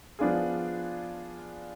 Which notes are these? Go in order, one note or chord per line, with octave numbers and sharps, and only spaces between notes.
F3 B3 D4 F4 G#4